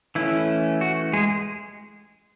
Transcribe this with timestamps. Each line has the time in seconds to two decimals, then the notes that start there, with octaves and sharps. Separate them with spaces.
0.15 E3 A3 C#4 E4
0.81 F#4
1.13 G#3 G#4